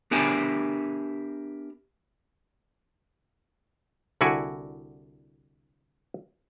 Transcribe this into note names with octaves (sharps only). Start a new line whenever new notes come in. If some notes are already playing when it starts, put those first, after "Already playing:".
B3 D4 G4 A#4 E5 G#5
C2 D3 E4 F#4 F#5 G#5